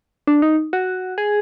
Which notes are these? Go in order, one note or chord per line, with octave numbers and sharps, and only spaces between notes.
D4
D#4
F#4
G#4